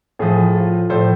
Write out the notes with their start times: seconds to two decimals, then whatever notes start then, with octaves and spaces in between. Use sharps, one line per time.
0.19 A2 F3 G#4
0.55 F4
0.90 A2 F3 A4 C5